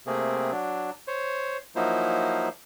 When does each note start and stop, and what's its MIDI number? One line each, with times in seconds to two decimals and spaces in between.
0.07 0.52 48
0.07 0.52 57
0.07 0.52 58
0.07 0.52 60
0.07 0.52 68
0.52 0.91 54
0.52 0.91 62
1.07 1.57 72
1.07 1.57 73
1.76 2.49 53
1.76 2.49 54
1.76 2.49 58
1.76 2.49 63
1.76 2.49 64
1.76 2.49 72